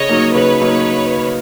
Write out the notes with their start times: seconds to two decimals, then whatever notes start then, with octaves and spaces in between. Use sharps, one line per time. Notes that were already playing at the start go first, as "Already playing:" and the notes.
Already playing: C#3 C#5 D#5
0.09 F#3 A#3 D#4
0.34 C#3 B4 C#5
0.60 F#3 A#3 D#4